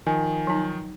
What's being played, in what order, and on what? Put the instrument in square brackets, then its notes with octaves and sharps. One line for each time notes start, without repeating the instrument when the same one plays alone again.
[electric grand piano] D#3 F3 [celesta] G#5
[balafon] F#3 D#4